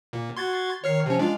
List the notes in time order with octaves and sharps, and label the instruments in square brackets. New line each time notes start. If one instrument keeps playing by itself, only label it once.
[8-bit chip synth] A#2
[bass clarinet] F#4 [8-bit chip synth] C6 G#6 A6
[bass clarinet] D#3 [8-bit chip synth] C#5 F6 C7
[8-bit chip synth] C3 C#4 [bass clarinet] F3
[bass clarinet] G#3 [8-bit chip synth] D4 F4